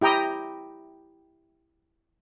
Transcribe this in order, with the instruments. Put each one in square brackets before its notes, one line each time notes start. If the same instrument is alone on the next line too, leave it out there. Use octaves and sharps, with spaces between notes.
[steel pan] E4 G4 G5 A#5 D#6